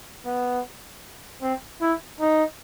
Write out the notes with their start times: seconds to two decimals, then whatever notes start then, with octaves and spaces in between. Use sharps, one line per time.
0.26 B3
1.42 C4
1.81 E4
2.20 D#4